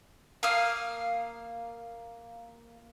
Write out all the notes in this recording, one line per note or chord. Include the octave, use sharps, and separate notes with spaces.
A#3 F5 D#6 F6